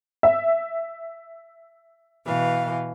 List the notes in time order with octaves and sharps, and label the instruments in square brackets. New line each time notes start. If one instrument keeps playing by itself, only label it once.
[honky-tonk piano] E5
[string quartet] B2 E3 F5